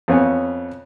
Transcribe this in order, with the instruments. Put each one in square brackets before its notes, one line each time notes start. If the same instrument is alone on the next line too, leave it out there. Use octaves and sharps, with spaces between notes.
[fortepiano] F2 B3 C#4 G#5